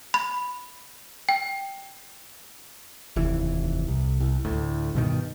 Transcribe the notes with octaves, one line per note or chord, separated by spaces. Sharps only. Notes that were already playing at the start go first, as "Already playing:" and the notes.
B5
G5
F1 D#2 E3
C2
C2
D2 A2
G2 B2 D#3